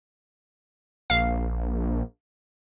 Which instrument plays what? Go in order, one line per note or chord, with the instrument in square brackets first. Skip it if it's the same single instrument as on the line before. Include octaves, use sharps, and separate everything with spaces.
[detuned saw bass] A#1 [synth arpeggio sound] F5